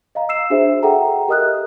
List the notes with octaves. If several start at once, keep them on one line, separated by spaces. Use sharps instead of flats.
D#5 F5 A#5
E6 C7 E7
D4 F#4 G#4 C5 E5
G#4 A4 E5 F#5 G5 A#5
G4 A#4 D#5 D#6 F6 F#6